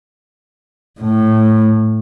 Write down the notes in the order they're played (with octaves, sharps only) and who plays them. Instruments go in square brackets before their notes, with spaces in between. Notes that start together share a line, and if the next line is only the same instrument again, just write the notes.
[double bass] A2